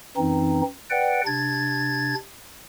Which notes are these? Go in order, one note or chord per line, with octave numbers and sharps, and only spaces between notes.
F#2 E3 C4 D#4
B4 D5 F#5 G5
C3 D4 G#6 A6